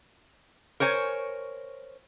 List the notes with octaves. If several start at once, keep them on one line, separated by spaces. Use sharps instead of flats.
A#4 C5 C#5 G#5